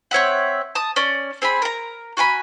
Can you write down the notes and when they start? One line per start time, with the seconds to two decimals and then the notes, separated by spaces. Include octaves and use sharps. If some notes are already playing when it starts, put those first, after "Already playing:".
0.11 C4 C#5 E5 F#5
0.75 A5 D#6
0.96 C#4 D5
1.42 C4 G#4 G#5 B5
1.62 A#4 A#5
2.17 F#4 A#4 G#5 B5